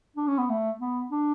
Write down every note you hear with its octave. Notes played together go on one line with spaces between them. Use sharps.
D4
C#4
B3
A3
B3
D4